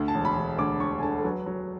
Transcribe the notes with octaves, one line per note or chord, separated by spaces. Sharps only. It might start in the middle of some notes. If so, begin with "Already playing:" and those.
Already playing: D2
A5
E1
B5
E1
D2 D6
E1 C#6
G#5
D3 A5
A4
F#3 B4
F#3